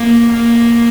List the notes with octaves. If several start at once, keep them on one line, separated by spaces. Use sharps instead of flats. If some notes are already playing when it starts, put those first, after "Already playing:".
Already playing: A#3
A#3